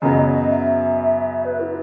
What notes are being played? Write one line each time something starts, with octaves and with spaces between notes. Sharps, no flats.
F#2 C#3 F#3 B3 D#5
C#5
D#5
E5
B4
E4